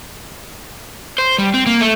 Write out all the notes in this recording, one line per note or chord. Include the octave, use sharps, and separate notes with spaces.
C5
G3
C4
A#3
A3